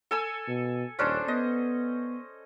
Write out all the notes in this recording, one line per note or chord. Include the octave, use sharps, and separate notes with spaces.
A4 G#5 E6
B2
D#1 C#4 D4 C5
B3 D#5